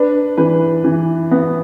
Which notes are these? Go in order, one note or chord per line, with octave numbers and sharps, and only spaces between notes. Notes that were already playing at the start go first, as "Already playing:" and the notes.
Already playing: D4 B4
E3 B4
E3
B3